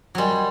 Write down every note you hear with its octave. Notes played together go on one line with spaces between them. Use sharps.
F#3 G3 A#4 D#5 G#5 C6